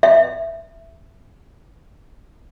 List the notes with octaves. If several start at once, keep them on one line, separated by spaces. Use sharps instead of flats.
E5